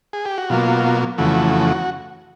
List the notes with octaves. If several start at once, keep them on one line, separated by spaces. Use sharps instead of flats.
G#4
G4
F#4
B2 F#3 A#3 F4
F2 C#3 E3 A3 F#4